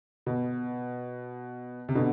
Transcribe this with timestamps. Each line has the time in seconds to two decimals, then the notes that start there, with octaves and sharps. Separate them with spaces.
0.26 B2
1.89 C3
1.95 B2 D3